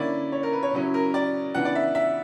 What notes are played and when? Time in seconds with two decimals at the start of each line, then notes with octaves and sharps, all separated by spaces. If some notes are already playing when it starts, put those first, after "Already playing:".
Already playing: D3 A#3 C#4 E4 D5
0.32 C#5
0.43 A#4
0.53 B4
0.63 C#5
0.73 C#3 F#3 C#4 E4
0.94 A#4
1.14 D5
1.55 C#3 E3 B3 D4 F#5
1.65 D5
1.75 E5
1.95 E5